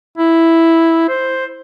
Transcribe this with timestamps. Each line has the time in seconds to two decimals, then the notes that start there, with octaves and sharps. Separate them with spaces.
0.18 E4
1.09 C5